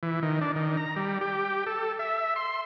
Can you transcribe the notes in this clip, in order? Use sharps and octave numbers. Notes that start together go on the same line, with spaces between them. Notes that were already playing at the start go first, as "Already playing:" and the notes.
E3
D#3
D4
D#3
A#5
G3
G4
A4
E5
C6